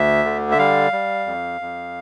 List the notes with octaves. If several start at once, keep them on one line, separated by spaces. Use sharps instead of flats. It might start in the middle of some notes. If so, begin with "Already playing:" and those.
Already playing: D2 E5
D3
E5
G3 F5
G3
F2
F2